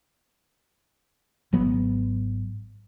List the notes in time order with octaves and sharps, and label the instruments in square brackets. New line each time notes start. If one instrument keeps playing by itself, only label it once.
[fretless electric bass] G#1 F#3 B3